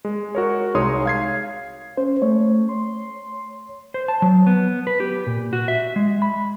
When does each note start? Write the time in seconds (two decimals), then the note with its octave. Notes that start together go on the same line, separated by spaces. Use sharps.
0.05 G#3
0.35 F#4 A#4 C#5
0.74 C2 G#3 D#4 C#5 C6 D#6
1.05 F5 G#6 C7
1.97 C#4 C5
2.22 A3 C#5
2.69 C6
3.94 C5
4.08 A5
4.22 F#3
4.47 B3
4.87 B4
5.00 G4
5.27 A#2
5.53 F#4
5.68 E5
5.96 G#3
6.22 B5